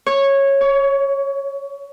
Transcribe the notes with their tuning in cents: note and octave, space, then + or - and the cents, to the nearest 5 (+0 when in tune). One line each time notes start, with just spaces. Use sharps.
C#5 -10
C#5 +25